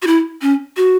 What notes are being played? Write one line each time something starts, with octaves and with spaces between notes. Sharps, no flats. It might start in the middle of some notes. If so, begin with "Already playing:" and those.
F#4
E4
C#4
F#4